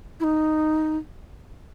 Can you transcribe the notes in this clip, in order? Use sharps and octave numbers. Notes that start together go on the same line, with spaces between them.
E4
D#4